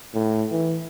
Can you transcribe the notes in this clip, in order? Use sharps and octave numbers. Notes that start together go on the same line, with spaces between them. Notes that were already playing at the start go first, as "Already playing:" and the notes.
A2
E3